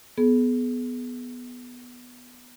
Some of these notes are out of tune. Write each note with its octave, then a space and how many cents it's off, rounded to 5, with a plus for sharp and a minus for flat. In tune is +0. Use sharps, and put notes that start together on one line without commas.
B3 +0 G#4 +35